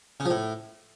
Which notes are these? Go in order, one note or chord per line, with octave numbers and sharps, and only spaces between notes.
C#3
F3
A2